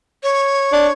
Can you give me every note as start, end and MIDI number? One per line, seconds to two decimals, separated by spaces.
0.23 0.92 73
0.73 0.88 62